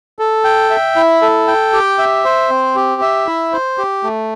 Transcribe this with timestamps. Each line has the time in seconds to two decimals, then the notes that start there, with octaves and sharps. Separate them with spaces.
0.19 A4
0.44 G5
0.70 E5
0.96 E4
1.22 A4
1.47 G5
1.73 G4
1.99 E5
2.25 C5
2.50 C4
2.75 G4
3.02 E5
3.27 E4
3.53 C5
3.78 G4
4.04 A3